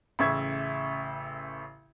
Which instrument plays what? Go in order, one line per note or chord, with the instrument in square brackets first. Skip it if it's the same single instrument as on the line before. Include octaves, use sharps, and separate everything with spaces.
[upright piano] A1 C#3 E5 C#6 G#6